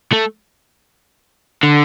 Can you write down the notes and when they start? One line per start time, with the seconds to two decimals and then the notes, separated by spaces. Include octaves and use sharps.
0.12 A3
1.63 D3